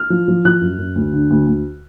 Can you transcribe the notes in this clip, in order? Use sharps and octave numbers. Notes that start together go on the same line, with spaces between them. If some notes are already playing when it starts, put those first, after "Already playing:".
Already playing: F6
F3
F3
F3 F#6
F#2
F#2
D2
D3
D2
D2